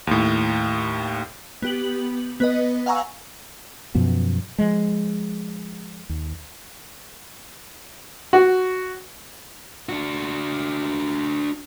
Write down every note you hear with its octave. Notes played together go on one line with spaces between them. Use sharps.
D#2 A2
B3 G4 F#7
B3 B4 D#5
F5 F#5 G#5 A#5 C#6 E6
F#2 B2 F3 B3
F3 G#3
D#2
F#4
D4 F#4